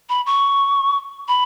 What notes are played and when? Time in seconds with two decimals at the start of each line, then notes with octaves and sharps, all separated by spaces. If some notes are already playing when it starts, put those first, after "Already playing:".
0.09 B5
0.26 C#6
1.28 B5